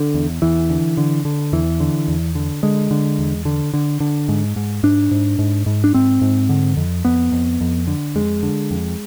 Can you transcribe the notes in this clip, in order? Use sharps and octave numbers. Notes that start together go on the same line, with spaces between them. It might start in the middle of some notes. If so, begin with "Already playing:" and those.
Already playing: D3
E2
E2 E3
D3
D3
D3
E2 E3
D3
E2
D3
D3 G#3
D3
E2
D3
D3
D3
G#2
G#2
G#2 D4
G#2
G#2
G#2
D4
G#2 C4
G#2
D3
F2
F2 B3
F2
F2
D3
F2 G#3
D3
F2